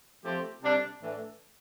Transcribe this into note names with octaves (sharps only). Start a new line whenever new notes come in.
F3 A3 C4 G4
C3 G3 D4
A2 E3 A3 D4